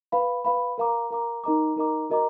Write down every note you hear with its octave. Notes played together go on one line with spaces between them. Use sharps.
B4 F5 B5
B4 F5 B5
A#4 F5 A#5 D6
A#4 F5 A#5 D6
D#4 A#4 D#5 A#5 D6
D#4 A#4 D#5 A#5 D6
F#4 A#4 D#5 A#5 D6